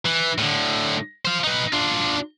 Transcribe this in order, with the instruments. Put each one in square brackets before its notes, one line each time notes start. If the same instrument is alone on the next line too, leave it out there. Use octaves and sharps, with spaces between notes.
[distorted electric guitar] E3
A2 D3
C5 F5
D#4 B4
D4 F4